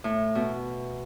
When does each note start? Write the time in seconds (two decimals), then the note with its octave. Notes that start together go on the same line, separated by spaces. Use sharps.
0.04 A2
0.35 B2